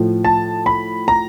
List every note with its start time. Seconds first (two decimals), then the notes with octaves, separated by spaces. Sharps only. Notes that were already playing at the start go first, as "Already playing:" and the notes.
Already playing: A2 F3
0.24 A5
0.66 B5
1.08 A#5